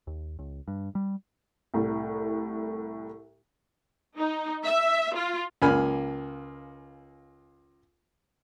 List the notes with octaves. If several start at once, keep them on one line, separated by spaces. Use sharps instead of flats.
D#2
C#2
G2
G3
C2 A2
D#4
E5
F4
C#2 A#3 G#5 B5 F6